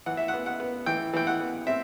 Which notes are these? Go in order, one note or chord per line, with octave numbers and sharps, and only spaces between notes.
E3 F#5
E5
F#5
B3
F#5
B3
E3 G5
E3 G5
F#5
B3
C4 E5